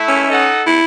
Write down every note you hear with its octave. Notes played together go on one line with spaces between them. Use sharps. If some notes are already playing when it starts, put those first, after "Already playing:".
Already playing: A3 E4 E5
C#4
D#4 A4 D#5 F#5
E4